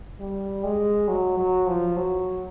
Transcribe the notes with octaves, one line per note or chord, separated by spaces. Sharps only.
G3
G#3
F#3
F#3
F3
F#3